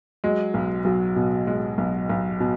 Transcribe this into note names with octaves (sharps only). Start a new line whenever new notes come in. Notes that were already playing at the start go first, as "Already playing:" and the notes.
F#3 G#3
B1
B1 F#3
B2
F#3 G#3
B1
B1
B2